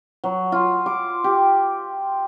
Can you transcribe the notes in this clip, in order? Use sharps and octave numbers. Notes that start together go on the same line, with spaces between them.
F#3
F4
D6
G4